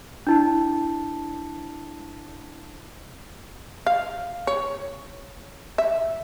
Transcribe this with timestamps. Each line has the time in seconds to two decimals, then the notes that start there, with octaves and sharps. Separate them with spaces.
0.27 D4 E4 A5
3.86 F5
4.47 C#5
5.78 E5